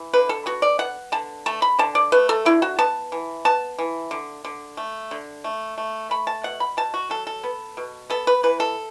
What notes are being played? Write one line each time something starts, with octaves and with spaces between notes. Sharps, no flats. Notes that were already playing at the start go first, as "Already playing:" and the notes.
Already playing: E3
D3 B4
A4
B3 F#4
D5
B3 F#5
D3 A5
A3 A5
B5
D3 A5
D5
A3 B4
A4
D3 E4
F#4
B3 A5
E3
B3 A5
E3
D3
D3
A3
D3
A3
A3
A3 B5
A5
B2 F#5
B5
B2 A5
F#4
F#3 A4
A4
B3
B2
B3 A4
B4
E3 B4
A4